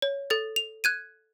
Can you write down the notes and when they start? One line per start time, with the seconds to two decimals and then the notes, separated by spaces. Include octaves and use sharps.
0.02 C#5
0.30 A4 A6
0.56 F7
0.84 F#6 G#6 D#7